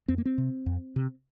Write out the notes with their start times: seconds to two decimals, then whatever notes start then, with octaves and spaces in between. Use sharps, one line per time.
0.08 F2 C4
0.18 A#3
0.25 C4
0.38 C3
0.66 F2
0.96 C3